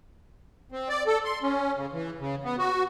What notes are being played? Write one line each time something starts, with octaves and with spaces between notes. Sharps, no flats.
C4
D5
A4
C6
C#4
C#3
E3
C#3
B3
F#4